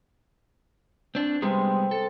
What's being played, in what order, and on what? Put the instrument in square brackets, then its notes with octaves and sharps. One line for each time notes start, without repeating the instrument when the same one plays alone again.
[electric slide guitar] C4 D4
[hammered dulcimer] C3 [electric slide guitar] G3 G#3 B3
[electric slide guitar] A4